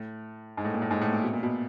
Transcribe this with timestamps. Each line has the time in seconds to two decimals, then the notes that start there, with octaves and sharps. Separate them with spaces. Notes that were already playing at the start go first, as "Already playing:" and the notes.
Already playing: A2
0.57 G#2
0.65 A2
0.74 A#2
0.82 A2
0.91 G#2
1.02 A2
1.12 A#2
1.24 B2
1.33 A#2
1.43 B2